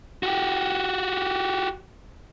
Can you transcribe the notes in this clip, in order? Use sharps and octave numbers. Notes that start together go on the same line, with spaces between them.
F#4 G4